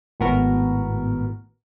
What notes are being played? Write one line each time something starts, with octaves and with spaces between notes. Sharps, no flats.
G#1 A2 B3 F#4 A#4